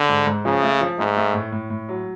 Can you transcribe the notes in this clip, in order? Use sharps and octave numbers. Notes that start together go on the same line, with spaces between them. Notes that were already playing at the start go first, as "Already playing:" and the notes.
Already playing: D3
G#2
G#2
C#3 F3
A3
F3
G#2 A3
A3
A2
A2
A2
F#3